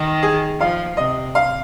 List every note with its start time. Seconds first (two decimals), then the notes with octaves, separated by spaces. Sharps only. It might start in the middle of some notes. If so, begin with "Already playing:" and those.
Already playing: D#3
0.23 G#4
0.60 F3 F5
0.97 C3 D#5
1.35 F5